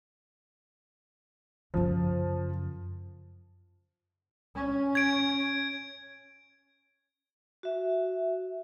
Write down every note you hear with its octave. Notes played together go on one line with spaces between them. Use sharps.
F#2 C#3 F3
C#4
G#6 D7
F#4 E5